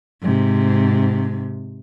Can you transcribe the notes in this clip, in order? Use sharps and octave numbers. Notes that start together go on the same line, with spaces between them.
G#2 C3